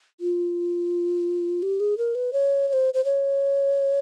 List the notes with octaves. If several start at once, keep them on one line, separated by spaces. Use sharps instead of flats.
F4
G4
G#4
A#4
B4
C#5
C#5
C5
C5
C#5